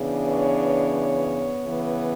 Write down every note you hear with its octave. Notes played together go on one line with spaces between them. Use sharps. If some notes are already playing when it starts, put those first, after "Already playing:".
Already playing: C#3 E3 B3 D4
C#5
C#3 E3 B3